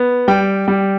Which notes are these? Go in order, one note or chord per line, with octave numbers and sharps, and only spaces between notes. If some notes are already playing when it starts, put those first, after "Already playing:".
Already playing: B3
G3 G5
G3